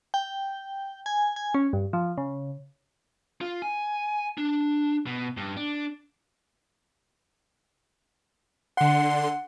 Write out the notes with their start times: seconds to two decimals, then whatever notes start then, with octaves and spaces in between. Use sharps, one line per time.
0.14 G5
1.06 G#5
1.36 G#5
1.54 C#4
1.73 G2
1.93 F3
2.18 C#3
3.41 F4
3.62 G#5
4.38 D4
5.06 B2
5.37 G2
5.57 D4
8.77 D3 F#5 C6